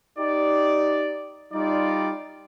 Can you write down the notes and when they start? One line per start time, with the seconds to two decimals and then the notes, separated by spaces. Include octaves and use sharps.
0.19 D#4 G4 D5
1.53 G3 D#4 F4 D5